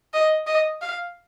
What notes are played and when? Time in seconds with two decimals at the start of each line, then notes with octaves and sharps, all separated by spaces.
0.14 D#5
0.47 D#5
0.82 F5